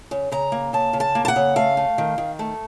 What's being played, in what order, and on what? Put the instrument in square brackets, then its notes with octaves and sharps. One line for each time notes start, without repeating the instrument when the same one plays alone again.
[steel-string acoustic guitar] C#3
C#3 A#5
A#3
C#3 A5
C#3
A5
A#3
A5
F#5
C#3
A3 F5
A3
D#3
D#3
A3